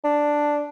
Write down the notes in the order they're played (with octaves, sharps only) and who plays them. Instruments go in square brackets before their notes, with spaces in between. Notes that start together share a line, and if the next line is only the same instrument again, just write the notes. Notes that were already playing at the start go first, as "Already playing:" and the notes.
[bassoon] D4